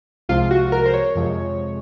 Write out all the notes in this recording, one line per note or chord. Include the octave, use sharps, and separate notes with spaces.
C2 C3 F3 G#3 F4
F#4
A#4
C5
C#5
F2 C3 F3 G#3